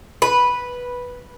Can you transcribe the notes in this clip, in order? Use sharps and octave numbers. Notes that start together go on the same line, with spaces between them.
B4